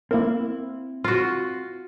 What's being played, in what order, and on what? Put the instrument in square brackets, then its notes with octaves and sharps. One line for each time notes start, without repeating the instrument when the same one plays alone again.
[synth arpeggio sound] A#3 A#4 [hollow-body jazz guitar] C4 E4
[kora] F4 F#4